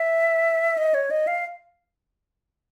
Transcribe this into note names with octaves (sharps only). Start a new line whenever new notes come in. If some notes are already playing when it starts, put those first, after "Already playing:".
Already playing: E5
D#5
C#5
D#5
F5